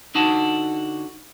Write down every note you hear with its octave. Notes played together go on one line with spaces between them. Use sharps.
D3 D#4 F#4 A5